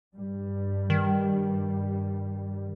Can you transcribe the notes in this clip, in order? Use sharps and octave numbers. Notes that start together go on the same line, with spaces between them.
G2 G3
D#3